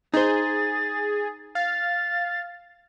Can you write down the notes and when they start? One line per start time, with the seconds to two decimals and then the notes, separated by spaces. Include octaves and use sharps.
0.14 D#4 G#4 C5 A6
1.55 F5 A6